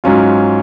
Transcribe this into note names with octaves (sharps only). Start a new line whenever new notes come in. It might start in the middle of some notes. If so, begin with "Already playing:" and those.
G#2 F#3 C#4 F4